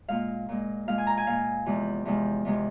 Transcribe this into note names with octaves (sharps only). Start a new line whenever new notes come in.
A#2 G#3 F5
A#2 G#3
A#2 G#3 F5
G#5
A#5
G#5
A#2 G#3 F5
E2 C3 F3 G#3
E2 C3 F3 G#3
E2 C3 F3 G#3